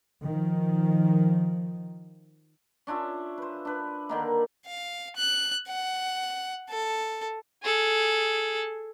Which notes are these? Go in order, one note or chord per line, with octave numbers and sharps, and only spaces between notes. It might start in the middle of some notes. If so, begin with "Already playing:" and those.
D#3 F3
C#4 D4 F4 E5
B4 C5
D4 B4
D3 D#3 A#3
F5
F#6
F#5
A4
G#4 A4